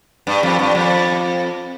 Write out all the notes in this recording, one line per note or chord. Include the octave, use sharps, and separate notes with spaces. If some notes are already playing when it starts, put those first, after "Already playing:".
G2
F2
G2
F2